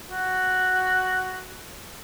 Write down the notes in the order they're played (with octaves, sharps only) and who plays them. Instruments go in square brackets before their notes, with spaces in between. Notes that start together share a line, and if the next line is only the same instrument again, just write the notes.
[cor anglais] F#4